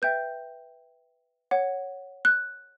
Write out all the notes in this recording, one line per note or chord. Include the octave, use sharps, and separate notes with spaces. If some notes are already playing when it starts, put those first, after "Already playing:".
B4 E5 G5 G6
C#5 F#5
F#6